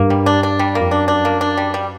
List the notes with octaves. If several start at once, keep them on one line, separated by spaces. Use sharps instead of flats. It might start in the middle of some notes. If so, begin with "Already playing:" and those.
Already playing: G2 A#3
G3
D4
D4
G3
F2 A#3
F#2 D4
D4
A#3
D4
G3
G3